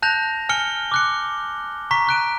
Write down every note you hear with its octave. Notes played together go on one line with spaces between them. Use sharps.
A5 F#6 G6 A#6 F7
G#5 F6 C#7 G7
D6 F#6 C#7
A#5 C#6 B6
C#6 F#6 D7 D#7